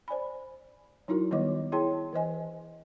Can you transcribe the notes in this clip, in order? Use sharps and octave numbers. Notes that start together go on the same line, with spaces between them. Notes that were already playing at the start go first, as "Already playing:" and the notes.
C5 D5 G#5 B5
F#3 D#4 E4 F#4 A#4
D#3 G3 B3 C#5 D#5 D6
E4 G#4 C#5 G5 A5 C6
E3 C5 D#5 G#5